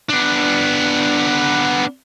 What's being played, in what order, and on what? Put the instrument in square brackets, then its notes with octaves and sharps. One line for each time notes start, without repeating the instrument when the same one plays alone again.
[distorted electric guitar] B3 D4